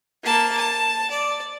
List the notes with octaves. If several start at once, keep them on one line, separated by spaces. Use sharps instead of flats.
A#3 A5
A5
D5